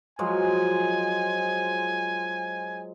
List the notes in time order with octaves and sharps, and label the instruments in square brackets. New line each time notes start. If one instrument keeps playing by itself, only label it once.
[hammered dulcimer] F3 F#3 G#3 [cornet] G#5